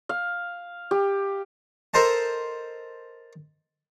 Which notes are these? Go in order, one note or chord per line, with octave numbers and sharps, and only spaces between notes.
F5
G4
A4 A#4 C5 D#5 A5